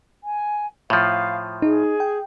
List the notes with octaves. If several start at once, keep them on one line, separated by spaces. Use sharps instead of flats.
G#5
A2 F3 F5
D#4 G#4
G5